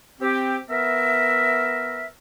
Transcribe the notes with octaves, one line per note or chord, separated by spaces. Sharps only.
C4 G4
B3 A#4 E5